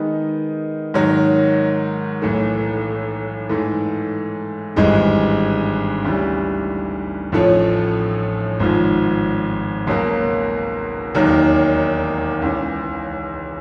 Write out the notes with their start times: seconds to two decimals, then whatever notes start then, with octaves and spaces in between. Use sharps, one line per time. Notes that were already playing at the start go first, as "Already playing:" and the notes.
Already playing: D#3 G#3 B3 D#4
0.94 G#2 D#3 F#3
2.22 B1 A2 E3 A3
3.49 G#2 E3 A3
4.76 G#1 G2 E3 G#3
6.05 D2 C#3 E3 G3
7.32 A1 A2 F3 A3 C#4
8.60 G#1 G#2 F3
9.87 C#2 B2 F#3 A#3
11.15 E1 D#2 D#3 F#3
12.42 C#2 C#3 E3